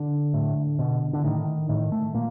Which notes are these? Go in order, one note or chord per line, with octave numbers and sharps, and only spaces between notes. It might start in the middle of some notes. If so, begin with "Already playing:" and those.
Already playing: D3
A2
B2
D3
A2 D#3
A2 D#3
A3
A#2 A#3